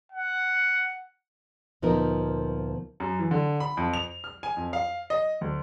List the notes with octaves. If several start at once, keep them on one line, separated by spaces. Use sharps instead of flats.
F#5
D2 A#2 F3 B3 D#4 A#4
F#2
E3
D3
B5
F2
F7
F6
G#5
F2
F5
D#5
D2